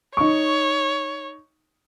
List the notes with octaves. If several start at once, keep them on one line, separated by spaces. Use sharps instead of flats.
D#4 C#5 C#6